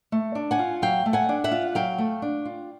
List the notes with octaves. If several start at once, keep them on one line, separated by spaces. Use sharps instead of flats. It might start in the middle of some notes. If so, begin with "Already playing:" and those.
A3
D4
F#5 G#5
F4
F#3 F5 G5
A3
F#5 G#5
D4
E5 F#5
F4
F#3 F5 G5
A3
D4
F4